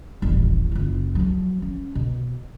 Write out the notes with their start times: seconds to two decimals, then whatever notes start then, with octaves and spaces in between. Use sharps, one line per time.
0.22 D#1 A1
0.71 F#1 F4
1.15 F3 F#3
1.62 C#4
1.95 B2